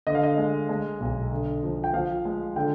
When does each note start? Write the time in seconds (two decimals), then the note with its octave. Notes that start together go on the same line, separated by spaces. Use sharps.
0.07 D3 D#5
0.15 F5
0.23 D#5
0.38 G#3
0.69 G#3
1.00 B1
1.31 D3
1.63 F3
1.84 G5
1.93 F3 F5
2.25 G#3
2.56 D3 G5